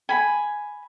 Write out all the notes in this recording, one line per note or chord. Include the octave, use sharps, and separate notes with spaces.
G#5 B5